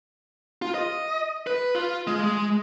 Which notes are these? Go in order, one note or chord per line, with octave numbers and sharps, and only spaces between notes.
F4
D#5
B4
F4
G#3
G#3